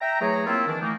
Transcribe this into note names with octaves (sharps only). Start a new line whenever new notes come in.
E5 G5 A#5
E3 F#3 A3 G#4 C#5 A#5
A#3 C4 E4 F4
D#3 E3 D4
E3 A3 A#3 D#4